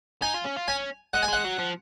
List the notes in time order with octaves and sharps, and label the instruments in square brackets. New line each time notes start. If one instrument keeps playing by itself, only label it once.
[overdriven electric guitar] D#4 [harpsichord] G#5
[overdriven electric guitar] F4
C#4
F4
[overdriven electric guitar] C#4 [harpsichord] G#5
[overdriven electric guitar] G#3 [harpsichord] F#5
[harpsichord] G#5
[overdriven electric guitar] G#3 [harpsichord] F#5
[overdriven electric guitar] F#3
F3